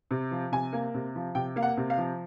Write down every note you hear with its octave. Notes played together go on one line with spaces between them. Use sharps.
C3
F3
C3 G#5
A#3
C3
F3
C3 G5
A#3 F5
F#5
C3
F5
F3